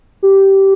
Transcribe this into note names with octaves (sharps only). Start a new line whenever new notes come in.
G4